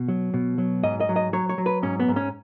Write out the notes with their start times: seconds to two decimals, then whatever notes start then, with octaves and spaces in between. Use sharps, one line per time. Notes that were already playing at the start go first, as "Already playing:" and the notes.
Already playing: B2
0.08 F#3
0.34 B2
0.58 F#3
0.83 G#2 D#5
1.00 D#5
1.09 F#3
1.16 D#5
1.33 F#3 C#5
1.49 C#5
1.58 F#3
1.66 B4
1.82 G#2 C#4
2.00 B3
2.08 G#2
2.16 C#4